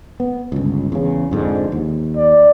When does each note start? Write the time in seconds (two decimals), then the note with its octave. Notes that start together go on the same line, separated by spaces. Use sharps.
0.20 B3
0.52 G1 C#2
0.92 E2 C#3
1.31 F2 G#2 D3
1.72 D#2
2.17 D5